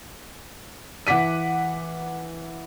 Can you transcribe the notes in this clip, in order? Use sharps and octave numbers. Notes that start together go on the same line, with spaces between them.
E3 F#5 D6 B6 D#7